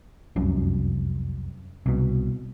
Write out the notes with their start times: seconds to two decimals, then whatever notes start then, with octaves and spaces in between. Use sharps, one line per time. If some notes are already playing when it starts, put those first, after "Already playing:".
0.36 F1 C2 F#2
1.86 C2 B2